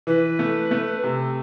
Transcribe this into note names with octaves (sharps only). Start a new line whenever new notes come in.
E3 B4
A3
A3
C3